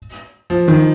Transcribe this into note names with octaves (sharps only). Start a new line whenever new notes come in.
F3
D#3